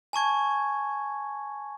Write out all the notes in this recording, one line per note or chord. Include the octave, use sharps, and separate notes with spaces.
G#5 A5 C#6 G#6